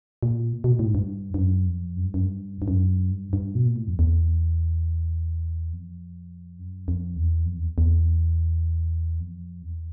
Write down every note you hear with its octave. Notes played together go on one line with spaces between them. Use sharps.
A#2
B2
A#2
A2
G#2
G2
G2
F#2
F2
F#2
G2
F#2
G2
G2
F#2
G2
G2
B2
A#2
A2
F2
E2
F2
F#2
F2
E2
F2
E2
E2
F2
E2